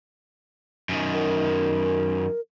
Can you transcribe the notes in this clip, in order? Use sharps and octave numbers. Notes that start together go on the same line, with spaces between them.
F#2 D#3
A#4